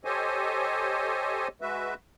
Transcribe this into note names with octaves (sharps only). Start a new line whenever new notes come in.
G4 A4 C5 C#5 D#5 G#5
G#3 F#4 B4 E5